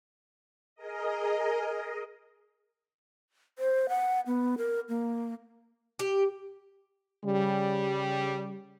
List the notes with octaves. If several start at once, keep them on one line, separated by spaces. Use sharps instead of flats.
G#4 A#4 D#5
C5
F#5
B3
A#4
A#3
G4
C#3 G3